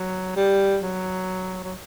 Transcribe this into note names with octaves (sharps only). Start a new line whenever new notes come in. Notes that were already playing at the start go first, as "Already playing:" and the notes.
Already playing: F#3
G3
F#3
F#3